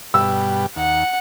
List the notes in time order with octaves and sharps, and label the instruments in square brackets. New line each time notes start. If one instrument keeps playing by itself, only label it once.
[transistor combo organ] G2 B2 G3 [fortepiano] E6
[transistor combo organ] D#2 [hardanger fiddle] F#5